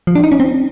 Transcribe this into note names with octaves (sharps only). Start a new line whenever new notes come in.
F3
D4
D#4
C#4
C4